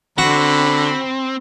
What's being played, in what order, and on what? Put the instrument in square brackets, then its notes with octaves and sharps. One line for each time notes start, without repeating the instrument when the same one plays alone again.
[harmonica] D3 [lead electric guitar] C4 [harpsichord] F#4 [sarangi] B5